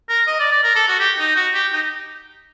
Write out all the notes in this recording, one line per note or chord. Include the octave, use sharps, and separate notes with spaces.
A#4
D#5
D5
D5
A#4
A4
F#4
G4
D#4
F#4
G4
D#4